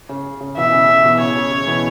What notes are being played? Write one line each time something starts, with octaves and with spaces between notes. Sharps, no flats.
C#3
C#3
B2 E3 E5
C#3
C#3
B2 E3
C#3 C#5
C#3
C#3
B2 E3